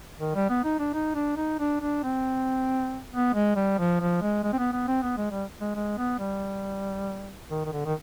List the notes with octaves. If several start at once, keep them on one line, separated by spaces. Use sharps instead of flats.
D#3
G3
B3
D#4
D4
D#4
D4
D#4
D4
D4
C4
B3
G#3
G3
F3
F3
G#3
G#3
C4
B3
B3
C4
B3
G#3
G3
G#3
G#3
B3
G3
D#3
D#3
D3
D#3